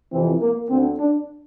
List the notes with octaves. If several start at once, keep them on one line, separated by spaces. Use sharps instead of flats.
F2 C3 E3 C4
A#3
D2 D3 C4
D4